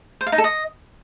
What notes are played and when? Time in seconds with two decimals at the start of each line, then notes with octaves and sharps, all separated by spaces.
0.21 C5
0.26 F5
0.32 D#4
0.38 A4
0.44 D#5